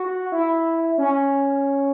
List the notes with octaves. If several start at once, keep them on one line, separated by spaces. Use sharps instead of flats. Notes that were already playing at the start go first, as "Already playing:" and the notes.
Already playing: F#4
E4
C#4